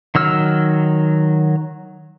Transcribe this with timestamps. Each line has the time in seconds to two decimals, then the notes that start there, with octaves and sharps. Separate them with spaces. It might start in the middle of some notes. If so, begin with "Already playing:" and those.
0.15 D#3 F#3 E6 F6